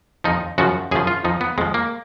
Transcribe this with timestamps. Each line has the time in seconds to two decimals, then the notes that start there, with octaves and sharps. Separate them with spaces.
0.24 F2 F3 D#4
0.58 F#2 C#3 F3 F#4
0.91 F#2 C#3 F3 G#4
1.07 F4
1.24 F2 F3 D#4
1.41 B3
1.58 F2 F3 G#3
1.74 A#3